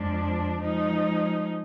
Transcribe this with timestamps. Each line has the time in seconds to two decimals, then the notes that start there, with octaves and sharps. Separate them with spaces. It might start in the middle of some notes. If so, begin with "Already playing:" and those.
Already playing: F2 F3 G#3 D4
0.59 F3 G#3 D#4